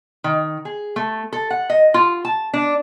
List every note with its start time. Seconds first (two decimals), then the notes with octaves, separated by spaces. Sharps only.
0.24 D#3
0.65 G#4
0.96 A3
1.33 A4
1.50 F#5
1.70 D#5
1.94 F4
2.25 A5
2.54 D4